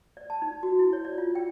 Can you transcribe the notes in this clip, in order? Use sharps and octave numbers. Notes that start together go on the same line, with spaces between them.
D5
A5
D#4
F#4
E4
C#5
D5
F4
G5